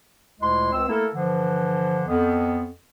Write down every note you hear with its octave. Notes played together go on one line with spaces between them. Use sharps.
D2 A#2 G#3 E4 C6
C#2 C4 E6
A3 A#3 E4 A4 A#4
G2 D3 E3 F3
F2 B3